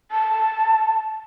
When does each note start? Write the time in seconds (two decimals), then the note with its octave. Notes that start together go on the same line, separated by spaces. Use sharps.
0.11 A5